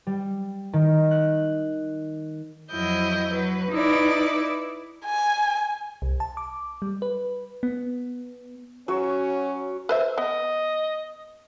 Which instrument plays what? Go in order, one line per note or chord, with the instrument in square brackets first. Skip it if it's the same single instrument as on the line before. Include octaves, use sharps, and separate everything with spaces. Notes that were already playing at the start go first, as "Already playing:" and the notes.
[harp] G3
D#3
F#6
[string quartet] F2 F#3 E4 D#5 G6
F#3 B4
D#4 E4 B4 D5
[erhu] G#5
[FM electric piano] C2
A5
D6
G3
B4
B3
[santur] F#3 C#5 E6 [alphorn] C#4
[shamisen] B4 C5 E5
[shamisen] B3 [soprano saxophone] D#5